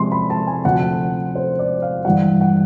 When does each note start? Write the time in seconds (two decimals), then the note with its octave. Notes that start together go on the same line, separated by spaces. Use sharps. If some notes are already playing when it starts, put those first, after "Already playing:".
Already playing: C3 F3 G#3 C6
0.12 B5
0.30 A5
0.47 G#5
0.65 D2 C3 F3 F#5
1.35 C5
1.59 D5
1.82 F5
2.05 G2 E3 G3 F#5
2.41 F#5